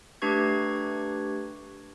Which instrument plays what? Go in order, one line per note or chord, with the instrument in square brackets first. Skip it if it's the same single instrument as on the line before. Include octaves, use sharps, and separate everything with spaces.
[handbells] A3 D4 G4 B4 C#6 G#6